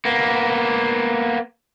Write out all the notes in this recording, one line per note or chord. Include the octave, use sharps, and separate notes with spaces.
A#3 B3